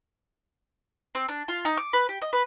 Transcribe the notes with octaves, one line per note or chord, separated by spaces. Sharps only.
C4
D4
F4
D#4
D6
B4
G4
D#5
B4